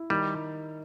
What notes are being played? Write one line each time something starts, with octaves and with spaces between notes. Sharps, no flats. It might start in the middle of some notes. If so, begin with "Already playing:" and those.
Already playing: E4
D#3 G3